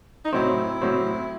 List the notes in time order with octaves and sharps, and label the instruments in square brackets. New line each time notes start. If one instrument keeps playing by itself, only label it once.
[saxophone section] D#4
[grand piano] A2 F#3 C4 [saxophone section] E4
[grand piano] A2 F#3 C4